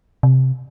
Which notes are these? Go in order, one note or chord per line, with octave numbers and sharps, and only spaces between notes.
C3